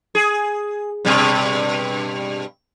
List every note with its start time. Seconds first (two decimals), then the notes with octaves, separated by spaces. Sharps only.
0.15 G#4
1.05 G2 B2